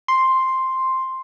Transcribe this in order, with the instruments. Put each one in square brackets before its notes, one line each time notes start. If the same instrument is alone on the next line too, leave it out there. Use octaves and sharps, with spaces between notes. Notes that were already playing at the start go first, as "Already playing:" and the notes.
[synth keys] C6